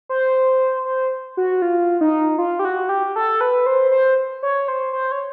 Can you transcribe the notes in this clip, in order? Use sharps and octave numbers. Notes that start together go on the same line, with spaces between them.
C5
C5
F#4
F4
D#4
F4
G4
F#4
G4
A4
B4
C5
C5
C#5
C5
C5
C#5